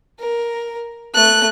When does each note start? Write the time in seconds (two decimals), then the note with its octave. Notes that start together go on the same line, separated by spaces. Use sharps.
0.19 A#4
1.14 A3 F#6